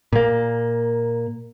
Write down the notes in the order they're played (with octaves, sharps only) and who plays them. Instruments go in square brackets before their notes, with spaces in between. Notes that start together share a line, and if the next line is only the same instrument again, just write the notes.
[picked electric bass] A#2 A#3